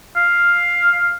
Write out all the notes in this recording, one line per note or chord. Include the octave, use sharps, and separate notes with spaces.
F5